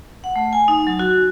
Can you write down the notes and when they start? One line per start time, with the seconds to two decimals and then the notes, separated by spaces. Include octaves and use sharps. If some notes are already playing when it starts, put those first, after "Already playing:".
0.24 F#5
0.36 A3
0.53 G#5
0.68 D#4
0.87 F#3
0.99 F#4